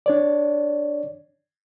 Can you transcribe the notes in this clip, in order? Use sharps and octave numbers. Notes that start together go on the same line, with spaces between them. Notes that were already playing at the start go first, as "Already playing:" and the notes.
D4 C#5 D5